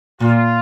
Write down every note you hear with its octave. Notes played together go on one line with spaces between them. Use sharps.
A#2 F4